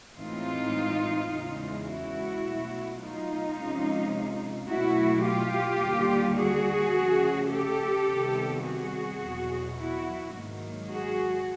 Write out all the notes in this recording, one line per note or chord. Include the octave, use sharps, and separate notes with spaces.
A2 E3 G#3 C4 D#4 F4
E2 C#3 E3 G#3
E4 F#4
B2 F#3 A3
D#4 F4
C3 F3 G#3 C#4
B2 F#3 A3 E4 F#4
F4 G4
D#2 D3 G3 A#3
F#4 G#4
C#3 F3 A3
G4 A4
C3 D#3 G3 B3
F#4 G#4
E2 B2 F#3
E4 F#4
G#2 D#3 F#3 A#3
F#4 G#4